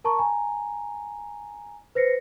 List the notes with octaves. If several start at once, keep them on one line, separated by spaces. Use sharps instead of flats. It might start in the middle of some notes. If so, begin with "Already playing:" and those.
A#4 A5 A#5 C#6
G#5 A#5
B4 C5 A#6 C7 C#7